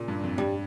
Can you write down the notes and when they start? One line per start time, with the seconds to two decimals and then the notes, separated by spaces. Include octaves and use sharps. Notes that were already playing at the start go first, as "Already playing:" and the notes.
Already playing: A#2 C#3
0.08 G2
0.23 F2
0.38 G2 G3